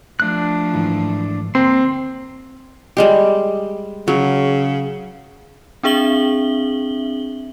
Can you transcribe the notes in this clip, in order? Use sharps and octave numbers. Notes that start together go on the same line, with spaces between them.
F3 A3 D4 F#6
G#2 D#3 E3
D2 A#3 C4 C5 C6
G3 G#3 G4
C#3 F#3
C4 D4 G#4 E5 F#7 G7